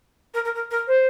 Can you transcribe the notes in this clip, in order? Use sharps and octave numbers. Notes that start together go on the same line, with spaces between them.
A#4
A#4
A#4
A#4
C5